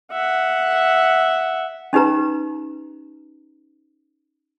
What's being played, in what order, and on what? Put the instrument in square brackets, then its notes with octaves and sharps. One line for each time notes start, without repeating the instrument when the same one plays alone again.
[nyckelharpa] E5 F#5
[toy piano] C#4 D#4 G4 B4 A#5